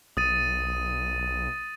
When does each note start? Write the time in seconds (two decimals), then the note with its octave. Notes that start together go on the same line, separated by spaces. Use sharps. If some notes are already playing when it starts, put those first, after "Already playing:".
0.17 B1 D#6 A6 D#7